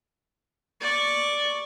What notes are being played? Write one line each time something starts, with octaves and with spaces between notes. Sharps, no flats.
D5 C#6